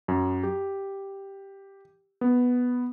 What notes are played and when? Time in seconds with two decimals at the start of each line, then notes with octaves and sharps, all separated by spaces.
0.08 F#2
0.43 G4
2.21 B3